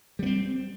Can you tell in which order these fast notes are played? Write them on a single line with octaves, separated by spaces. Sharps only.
G3 B3 C4